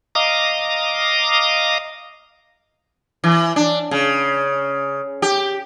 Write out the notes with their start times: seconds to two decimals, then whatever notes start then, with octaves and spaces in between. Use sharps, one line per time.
0.15 D#5 F5 A#5 D6 D#6
3.24 E3
3.56 D4
3.91 C#3
5.22 G4